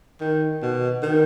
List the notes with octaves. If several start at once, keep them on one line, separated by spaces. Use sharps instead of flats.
D#3
B2
D#3